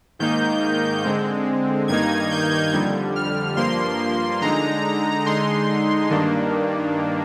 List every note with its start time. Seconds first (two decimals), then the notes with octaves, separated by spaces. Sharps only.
0.19 G#2 D#3 A#3 D#4 G6
1.04 D3 G#3 C4
1.88 G2 D#3 A#3 D#4 G#6
2.31 G6
2.73 F2 D3 G3
3.16 F6
3.57 G2 F3 A#3 C6
4.41 D3 G#3 D#4 A#5
5.25 D3 G#3 D#4 C6
6.10 G2 D#3 A#3 D4